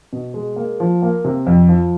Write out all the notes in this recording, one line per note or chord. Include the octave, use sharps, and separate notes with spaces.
B2
G#3
A#3
F3
A#3
C3
F2
F3